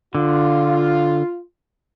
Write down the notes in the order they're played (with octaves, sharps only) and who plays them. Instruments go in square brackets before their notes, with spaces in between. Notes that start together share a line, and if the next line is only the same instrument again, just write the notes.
[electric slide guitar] D3 [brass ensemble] F4